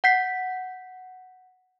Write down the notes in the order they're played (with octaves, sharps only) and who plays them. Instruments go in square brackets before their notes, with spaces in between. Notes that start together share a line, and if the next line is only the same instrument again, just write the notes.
[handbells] F#5 G6 B6 C7